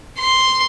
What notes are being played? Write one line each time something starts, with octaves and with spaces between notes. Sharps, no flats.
C6